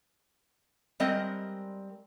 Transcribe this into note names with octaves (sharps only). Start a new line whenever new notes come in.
G3 G#3 C4 A#4 D#5